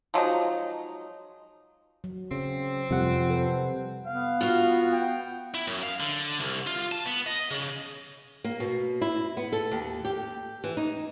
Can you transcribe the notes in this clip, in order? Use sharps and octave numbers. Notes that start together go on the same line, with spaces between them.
F3 F#3 G#3 D#4
F#3
C#3 C4
F2 C3 G3 F#5
A4 B4 C5
B3 F5
F4 F#4
G5
E4
F#2
F5
D3
C2
F4
A5
B3
D#5
C#3
A#3
B2
E4
B3
A4
D#2
G4
E3
D#4